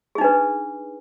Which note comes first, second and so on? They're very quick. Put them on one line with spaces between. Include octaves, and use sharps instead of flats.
G#4 D#4 D4 B4